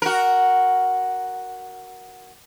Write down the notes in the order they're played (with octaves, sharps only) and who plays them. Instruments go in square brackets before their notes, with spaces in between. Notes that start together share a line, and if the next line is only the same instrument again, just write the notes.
[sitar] F#4 A#4